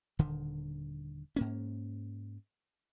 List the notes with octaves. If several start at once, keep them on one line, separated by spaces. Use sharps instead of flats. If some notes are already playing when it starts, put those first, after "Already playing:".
D#1 D3 D#3
G#2 A#3 C#4